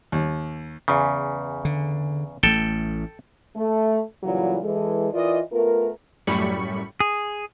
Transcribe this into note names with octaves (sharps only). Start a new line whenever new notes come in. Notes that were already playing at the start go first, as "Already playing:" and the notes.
D#2
E2 C#3
D3
A1 A3 A4 G5
A3
A#2 C#3 E3 F#3 G3 F4
E3 G#3 A4
E3 F4 A#4 D5 D#5
A3 B3 F4 A#4
F#2 A2 G3 B5 C#6 C#7
G#4